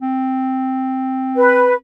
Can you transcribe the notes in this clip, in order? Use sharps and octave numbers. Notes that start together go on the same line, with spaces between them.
C4
B4